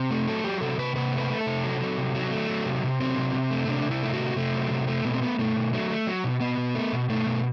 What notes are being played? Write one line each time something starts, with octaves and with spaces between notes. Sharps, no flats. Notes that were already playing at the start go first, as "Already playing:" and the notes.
Already playing: C3
A3
F#3 A4
F#3 G4
C3 A4
C3 B4
C3 B4
A3
B4
A3
A4
C3
F#3
F#3
C3
F#3
A3
F#3
C3
C3
F#3 C4
C3
C3
A3
C3 D4
C3
E4
A3
F#4
C3
C3 A3
F#3
C3
A3
B2 B3
C4
A3 B3
B2 A3
B2
F#3 A3
A3
F#3
B2
B2 B3
B2
A3
B2
B2 A3
B2